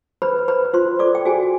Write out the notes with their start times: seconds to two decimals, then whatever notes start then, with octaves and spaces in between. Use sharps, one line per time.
0.22 B4 C5 B5
0.48 B4 C5 B5
0.74 F4 C5 C6
0.99 A4 D5 D6
1.15 G5
1.25 F#4 G#4 G#5